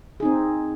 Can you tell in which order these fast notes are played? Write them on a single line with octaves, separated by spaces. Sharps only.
G#4 D#4 C4